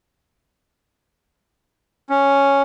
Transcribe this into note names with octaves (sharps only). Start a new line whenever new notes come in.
C#4